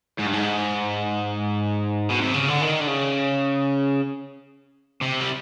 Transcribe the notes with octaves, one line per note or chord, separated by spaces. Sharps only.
G#2
G2
G#2
B2
C3
C#3
D3
D#3
D3
C#3
C3
G3